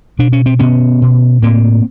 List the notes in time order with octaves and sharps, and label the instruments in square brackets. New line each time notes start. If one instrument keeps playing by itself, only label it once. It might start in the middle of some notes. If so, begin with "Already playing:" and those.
[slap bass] B2 D4
C#4
C4
B2 B3 C#4
B2
A2 A#3 C4